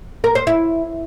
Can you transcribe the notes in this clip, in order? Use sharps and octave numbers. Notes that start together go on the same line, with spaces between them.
A#4
C5
E4